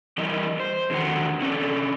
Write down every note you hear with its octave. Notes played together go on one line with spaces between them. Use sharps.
E3 G3 E4 A#4 D#5
C5
E2 D3 D#3 F#4 F#5 A#5
D3 C#4 A4 D5